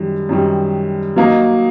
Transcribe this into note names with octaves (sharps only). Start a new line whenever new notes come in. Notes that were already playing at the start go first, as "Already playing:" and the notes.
Already playing: F#2 D#3 G3
F#2 D#3 G3
F#3 A#3 D#4